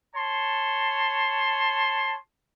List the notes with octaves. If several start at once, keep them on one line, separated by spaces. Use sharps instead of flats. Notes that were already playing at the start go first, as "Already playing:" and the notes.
C#5 A5 C6